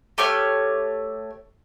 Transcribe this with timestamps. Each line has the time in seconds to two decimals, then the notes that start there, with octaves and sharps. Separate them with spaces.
0.18 A3 G4 C#5 F6